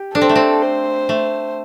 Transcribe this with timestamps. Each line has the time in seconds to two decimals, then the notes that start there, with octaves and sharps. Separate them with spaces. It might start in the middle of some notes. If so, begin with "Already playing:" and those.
Already playing: G4
0.14 D4 A4
0.21 C4
0.29 A3
0.35 C4
0.62 C5
1.09 A3